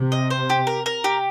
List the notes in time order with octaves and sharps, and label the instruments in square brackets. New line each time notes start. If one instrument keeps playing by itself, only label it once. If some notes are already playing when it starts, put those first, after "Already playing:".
Already playing: [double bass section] C3
[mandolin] D#5
C5
G4
A#4
A#4
G4